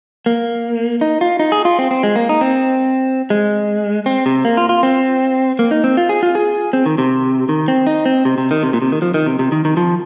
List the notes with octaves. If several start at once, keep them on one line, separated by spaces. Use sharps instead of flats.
A#3
D#4
F4
D#4
G#4
F4
C4
C4
G#3
A#3
D#4
C4
G#3
C4
C3
A#3
F4
F4
C4
A#3
D#4
C4
F4
G#4
F4
G#4
C4
D#3
C3
D#3
C4
D#4
C4
C3
C3
D#3
C3
A#2
C3
D#3
F3
D#3
C3
C3
D#3
D#3
F3